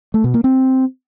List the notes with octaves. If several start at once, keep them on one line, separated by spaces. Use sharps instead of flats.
A3
B2
A#3
C4